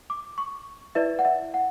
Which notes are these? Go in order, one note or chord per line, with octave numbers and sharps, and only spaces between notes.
D6
C#6
E4 B4 D5 E5
F#5
E5
F#5